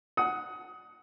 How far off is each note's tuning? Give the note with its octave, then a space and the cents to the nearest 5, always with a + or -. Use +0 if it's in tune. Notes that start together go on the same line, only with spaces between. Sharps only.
F#5 +0 D#6 +20